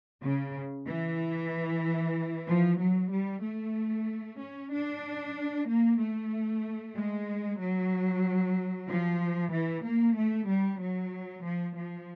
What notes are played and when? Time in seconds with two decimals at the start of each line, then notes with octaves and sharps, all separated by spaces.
0.22 C#3
0.86 E3
2.47 F3
2.79 F#3
3.11 G3
3.43 A3
4.39 C#4
4.71 D4
5.67 A#3
6.00 A3
6.95 G#3
7.59 F#3
8.88 F3
9.51 E3
9.84 A#3
10.16 A3
10.48 G3
10.80 F#3
11.45 F3
11.76 F3